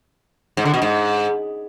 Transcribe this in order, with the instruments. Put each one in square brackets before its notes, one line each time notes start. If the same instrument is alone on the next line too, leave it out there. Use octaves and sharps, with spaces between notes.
[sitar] G#2
D3
B2
G#2